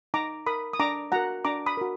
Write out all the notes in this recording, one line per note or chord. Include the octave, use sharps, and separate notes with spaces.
D#4 A#5 D6
A#4 B5 D#6
D#6
D4 A#5 D6
F#4 A#4 F#5 A#5
D4 A#5 D6
B5 D#6
F#4 A#4